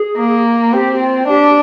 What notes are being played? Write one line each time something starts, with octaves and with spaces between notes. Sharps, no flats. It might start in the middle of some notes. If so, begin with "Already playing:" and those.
Already playing: G#4
A#3
C4 G4
F4
D4 G4